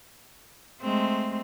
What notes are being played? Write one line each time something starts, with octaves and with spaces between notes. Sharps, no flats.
G#3 A3 C4